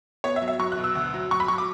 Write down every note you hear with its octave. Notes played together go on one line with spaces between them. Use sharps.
B3 C#5
E5
F#3
E5
F#3 C#6
F#6
B2
E6
D2
F#3
F#3 C#6
B5
F#3 C#6
D6